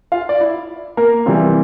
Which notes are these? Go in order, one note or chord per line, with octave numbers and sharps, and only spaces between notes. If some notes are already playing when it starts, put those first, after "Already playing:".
F4 F5
D5
E4 E5
A#3 A#4
C3 E3 G3 C4 F4